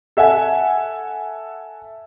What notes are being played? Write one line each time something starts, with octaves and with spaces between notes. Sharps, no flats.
A4 E5 F#5 G#5